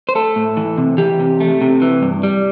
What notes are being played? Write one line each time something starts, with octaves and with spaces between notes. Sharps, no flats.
C5
A3 A4
A2
E3
C3
E3 G4
C3
A3
C3
E3
G2
G3